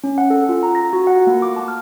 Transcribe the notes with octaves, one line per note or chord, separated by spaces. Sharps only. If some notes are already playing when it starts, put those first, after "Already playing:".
C#4
F#5
A4
F4
A#5
A#6
F#4
F#5
A#3
D6
A5
F6